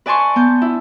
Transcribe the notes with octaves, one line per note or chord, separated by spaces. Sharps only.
B4 D5 G#5 A5 C6 C#6
B3 G6
E4